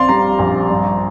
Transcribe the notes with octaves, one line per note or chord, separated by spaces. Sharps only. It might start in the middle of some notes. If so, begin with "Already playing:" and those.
Already playing: A#1 C4 D5 F5 C6
G3 A#5
A#1
G2